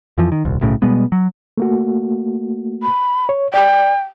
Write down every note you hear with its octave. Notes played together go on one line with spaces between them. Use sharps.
F2 E3 F3
D#3
D#1 C2
B1 A2 C#3
B2 G3 G#3 B3
F#3
A3 A#3 F#4
B5
C#5
D5 G5